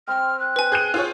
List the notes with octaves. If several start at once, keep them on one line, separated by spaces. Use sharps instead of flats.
C4 C5 G5 F6
F#6
G4 B4 G#5
G#4 G6 D#7
F4 G#4 C#5